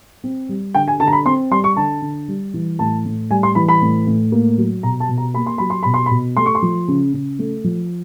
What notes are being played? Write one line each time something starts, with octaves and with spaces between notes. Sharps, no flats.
C4
G3
D3 G5
G#5
D3 A5
A#5
B5
C4 C6
G3 C6
C#6
D3 A5
D3
G3
E3
A2 A5
A2
G3 G#5
C6
E3 B5
B5
A2
A2
A#3
F#3
B2 A#5
A5
B2
A#5
A#3 B5
C6
F#3 B5
C6
B2 B5
C6
B5
B2
A3 C6
C#6
C6
F3
C#3
C#3
A3
F3